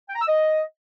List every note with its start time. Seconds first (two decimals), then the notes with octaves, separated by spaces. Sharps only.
0.09 G5
0.15 A#5
0.22 E6
0.28 D#5